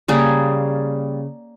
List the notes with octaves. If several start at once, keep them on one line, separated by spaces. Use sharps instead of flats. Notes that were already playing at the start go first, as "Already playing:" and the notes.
C#3 G3 A#3 G#4